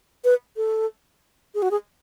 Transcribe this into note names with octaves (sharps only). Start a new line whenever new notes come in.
B4
A4
G#4
F#4
G#4